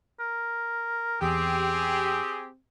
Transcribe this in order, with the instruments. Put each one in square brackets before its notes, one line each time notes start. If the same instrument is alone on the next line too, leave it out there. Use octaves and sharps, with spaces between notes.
[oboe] A#4
[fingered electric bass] E2 [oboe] C4 [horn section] G4 G#4